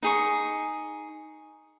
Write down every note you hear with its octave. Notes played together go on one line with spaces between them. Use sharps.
D#4 G#4 C#6